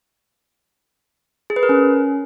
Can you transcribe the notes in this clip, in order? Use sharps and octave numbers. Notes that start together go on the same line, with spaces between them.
G#4
B4
A#4
C#4